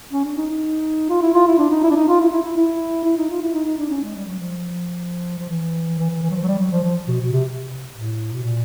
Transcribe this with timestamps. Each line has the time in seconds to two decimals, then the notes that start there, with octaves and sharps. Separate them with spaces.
0.13 C#4
0.24 D4
0.37 D#4
0.49 D#4
1.10 F4
1.22 E4
1.34 F4
1.47 E4
1.58 D4
1.71 D#4
1.83 E4
1.91 D4
1.96 D#4
2.08 F4
2.20 E4
2.32 E4
2.45 E4
2.57 E4
3.05 E4
3.17 D#4
3.30 F4
3.42 E4
3.54 D#4
3.66 D#4
3.78 D4
3.90 C#4
4.03 G#3
4.16 G3
4.27 F#3
4.39 F3
5.38 F3
5.49 E3
5.99 E3
6.10 E3
6.22 E3
6.31 F#3
6.35 F3
6.43 F#3
6.48 G3
6.59 F#3
6.71 F3
6.83 F3
7.08 B2
7.21 B2
7.33 C3
7.94 A2
8.33 B2
8.42 A#2